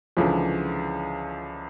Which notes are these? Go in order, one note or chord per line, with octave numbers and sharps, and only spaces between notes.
C#2 D3 E3 F3